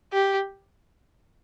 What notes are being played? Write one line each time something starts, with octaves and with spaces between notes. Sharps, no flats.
G4